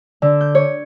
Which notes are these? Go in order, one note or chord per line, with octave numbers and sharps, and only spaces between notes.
D3
G6
C#5